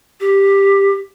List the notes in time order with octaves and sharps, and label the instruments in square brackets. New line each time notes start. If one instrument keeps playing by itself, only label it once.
[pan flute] G4